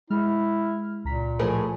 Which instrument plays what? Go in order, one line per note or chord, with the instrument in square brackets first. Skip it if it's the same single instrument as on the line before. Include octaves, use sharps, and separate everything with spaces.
[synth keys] G#3 F6 [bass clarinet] E4
[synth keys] C#2 A#5 B6 [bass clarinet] A#2
[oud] A2 G#4 A#4 [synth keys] F3 C5